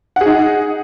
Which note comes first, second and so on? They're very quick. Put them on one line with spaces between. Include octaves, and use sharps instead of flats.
F#5 G#4 D#4